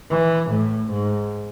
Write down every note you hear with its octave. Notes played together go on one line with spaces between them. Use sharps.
E3
A2
G#2